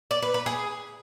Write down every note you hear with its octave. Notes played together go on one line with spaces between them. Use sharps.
D5
B4
B4
G#4